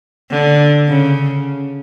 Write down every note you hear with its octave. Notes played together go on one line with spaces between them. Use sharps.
D3
C#3